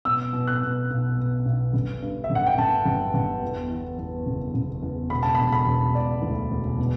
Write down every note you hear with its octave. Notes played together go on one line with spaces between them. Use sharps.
B2 E6
B2
F#6
B2
B1
B2
B1
G1
G2
E5
G1
F#5
G5
G1 A5
G1
G1
E2
E3
E2
F#1
F#1
E2
E1 B5
A5
E1 B5
B5
E1
E1 D5
D2
E1
B2